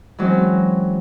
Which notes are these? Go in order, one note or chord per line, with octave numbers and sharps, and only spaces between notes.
E3 F#3 G#3 C4 C#4